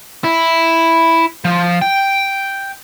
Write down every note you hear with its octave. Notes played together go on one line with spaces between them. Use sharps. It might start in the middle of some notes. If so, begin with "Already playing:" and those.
E4
F3
G5